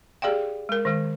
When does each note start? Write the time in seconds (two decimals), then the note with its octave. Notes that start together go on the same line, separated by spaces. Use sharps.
0.22 G4 G#4 D5 F5 G5
0.69 G#3 A#4
0.85 D#3 G#3